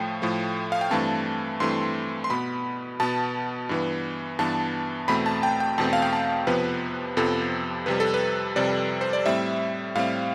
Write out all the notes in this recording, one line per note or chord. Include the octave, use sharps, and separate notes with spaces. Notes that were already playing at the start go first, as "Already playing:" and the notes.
Already playing: A2 F3 A3 G5
A2 F3 A3
F5
G5
G2 E3 A3 C4 A5
G2 E3 A3 C4 C6
C6
B2 B3 B5
B2 B3 A5
G2 E3 B3
G2 E3 B3 A5
E2 B2 A3 C4 B5
A5
G5
G5
E2 B2 A3 C4 A5
F5
G5
A5
F2 C3 F3 B3 B4
F2 C3 F3 B3 A4
F2 C3 G3 B4
A4
B4
F2 C3 G3 D5
C5
D5
A2 G3 C4 E5
A2 G3 C4 F5